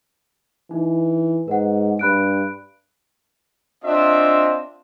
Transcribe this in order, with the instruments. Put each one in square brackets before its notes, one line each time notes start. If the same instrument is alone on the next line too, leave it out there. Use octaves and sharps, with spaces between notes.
[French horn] E3 [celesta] D#4
[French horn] G#2 [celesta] B4 F#5
[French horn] G2 [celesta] B5 F#6 D7
[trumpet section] C4 D4 F4 D#5 E5